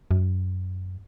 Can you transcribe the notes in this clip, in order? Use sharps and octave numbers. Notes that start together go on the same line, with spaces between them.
F#2